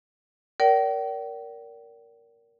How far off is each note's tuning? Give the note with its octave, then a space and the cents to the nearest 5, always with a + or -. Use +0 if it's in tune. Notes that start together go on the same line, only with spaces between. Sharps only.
A#4 +0 D5 -35 G5 -40